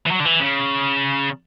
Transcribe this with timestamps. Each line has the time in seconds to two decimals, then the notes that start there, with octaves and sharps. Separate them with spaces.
0.06 E3
0.11 F#3
0.20 D3
0.26 E3
0.40 C#3